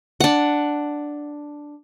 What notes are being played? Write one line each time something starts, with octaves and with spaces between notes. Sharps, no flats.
D4 F#5